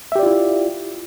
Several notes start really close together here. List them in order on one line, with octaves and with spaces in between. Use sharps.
E5 G4 D5 F4 E4